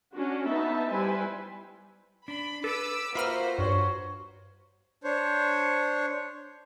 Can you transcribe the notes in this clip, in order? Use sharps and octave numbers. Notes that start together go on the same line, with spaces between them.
C#4 D4 F#4
B3 D#4 E5 A5
G3 E4 B4 C5 G#5
D4 B5
A4 B4 D6 E6
A#3 F4 F#4 B4 C5 E5 B5 F6
G2 C#5
D4 C5 C#5